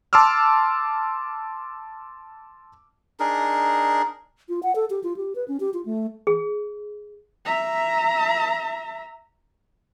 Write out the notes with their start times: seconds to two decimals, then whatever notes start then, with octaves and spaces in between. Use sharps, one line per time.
0.13 A5 C6 D6 E6 F6
3.20 D4 D#4 G#4 A#4
4.49 F4
4.63 F#5
4.75 A4
4.90 G4
5.04 F4
5.16 G4
5.35 B4
5.48 C#4
5.60 G4
5.74 F4
5.86 A3
6.27 G#4
7.45 E5 A#5